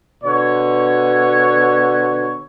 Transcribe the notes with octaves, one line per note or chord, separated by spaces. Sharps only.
B2 D3 C#5